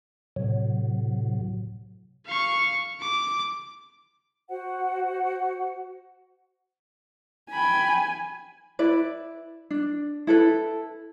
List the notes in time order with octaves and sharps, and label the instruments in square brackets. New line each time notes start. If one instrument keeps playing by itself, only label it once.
[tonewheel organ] A2 C3 F#3
[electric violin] F5 C#6
D6
[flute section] F#4 C5 F#5
[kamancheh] G5 B5 [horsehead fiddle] G#5
[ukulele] E4 B4 D5
D4
E4 A4 B4